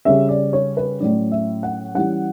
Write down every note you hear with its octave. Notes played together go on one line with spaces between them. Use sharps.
C#3 G3 C#4 E5
D5
C#5
B4
A2 F#3 C#4 D5
E5
F#5
E3 G3 C#4 F#5